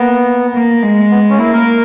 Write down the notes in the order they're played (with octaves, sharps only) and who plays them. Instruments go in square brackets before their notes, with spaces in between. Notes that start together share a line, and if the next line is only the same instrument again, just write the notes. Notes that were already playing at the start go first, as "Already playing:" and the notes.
Already playing: [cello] A#3 [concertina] B3
[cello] A#3
G#3
[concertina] B3
C#4
[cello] A#3 [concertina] E4
[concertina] A#4